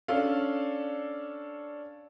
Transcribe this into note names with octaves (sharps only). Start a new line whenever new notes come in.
C#4 D4 A4 F5